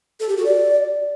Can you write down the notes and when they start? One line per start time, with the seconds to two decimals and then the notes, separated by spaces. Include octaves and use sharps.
0.20 A4
0.29 G4
0.37 F#4
0.46 D5